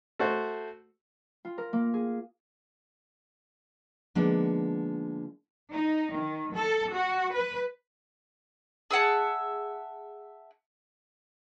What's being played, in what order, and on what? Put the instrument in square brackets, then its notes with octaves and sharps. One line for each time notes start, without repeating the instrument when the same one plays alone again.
[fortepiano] A3 F#4 C5
[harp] F4
A#4
A#3
G#4
[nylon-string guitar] D3 F3 G#3 A#3 B3 D#4
[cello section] D#4
D#3
A4
F#4
B4
[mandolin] G#4 E5 F#5 A5